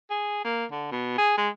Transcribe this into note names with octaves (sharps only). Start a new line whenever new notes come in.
G#4
A#3
D3
B2
G#4
G#3